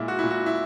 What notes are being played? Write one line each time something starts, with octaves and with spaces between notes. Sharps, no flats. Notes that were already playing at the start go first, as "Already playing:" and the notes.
Already playing: A#2 G#3 E4
F#4
A#2 E4
F#4
E4